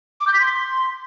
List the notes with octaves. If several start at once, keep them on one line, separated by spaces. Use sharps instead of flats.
D6
G6
B6
C6